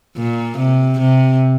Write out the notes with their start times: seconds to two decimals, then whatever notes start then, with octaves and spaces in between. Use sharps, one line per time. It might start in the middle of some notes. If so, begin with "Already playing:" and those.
0.16 A#2
0.58 C3
0.99 C3